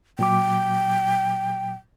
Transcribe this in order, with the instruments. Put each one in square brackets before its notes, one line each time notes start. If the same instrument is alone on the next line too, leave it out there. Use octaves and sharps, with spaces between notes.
[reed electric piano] A#2 F#3 D6 [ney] G5